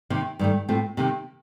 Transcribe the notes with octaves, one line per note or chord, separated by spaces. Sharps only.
C3 D#3 A#3
G2 D#3 A3
A2 A3 C4 F4
C3 D#3 A#3